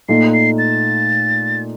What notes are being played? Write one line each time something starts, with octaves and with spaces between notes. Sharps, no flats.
A#2 A3 D#4 C7
C7
A6